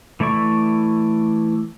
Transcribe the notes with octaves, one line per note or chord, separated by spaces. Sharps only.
E3 A3 E4 D5 C#6